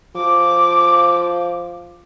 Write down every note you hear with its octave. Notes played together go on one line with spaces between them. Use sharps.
F3 D6